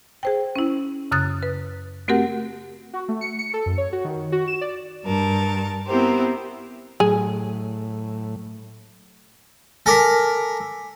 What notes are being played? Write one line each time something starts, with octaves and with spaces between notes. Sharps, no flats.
G#4 C5 G5
C#4 E4
F#2 C#3 D#6 F#6 A6
B4
A3 C4 F#4 G4 A#4 F#5
F#4
A3
C#7
C#7
A4
F#2
C#5
F#4
D#3
F#4
E7
D5
G2 A#4 A5
B3 C4 E4 G4 A#4 C5
A2 F#3 G#4
A4 A#4 G#5 D6 B6